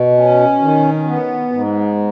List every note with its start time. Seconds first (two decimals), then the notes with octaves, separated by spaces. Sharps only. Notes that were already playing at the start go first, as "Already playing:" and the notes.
Already playing: B2
0.18 C#4
0.62 D#3
1.07 B3
1.51 G#2